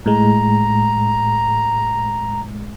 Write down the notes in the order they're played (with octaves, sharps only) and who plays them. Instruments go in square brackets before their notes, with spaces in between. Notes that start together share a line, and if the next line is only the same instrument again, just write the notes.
[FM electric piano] A2 G#3 [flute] A#5